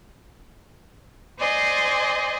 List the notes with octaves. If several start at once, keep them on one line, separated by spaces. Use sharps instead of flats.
C5 D5 D#5 G#5